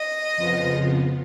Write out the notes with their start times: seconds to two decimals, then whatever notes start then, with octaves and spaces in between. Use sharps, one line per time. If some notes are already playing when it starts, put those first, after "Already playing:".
Already playing: D#5
0.36 F2 C#3 F3 B3 F4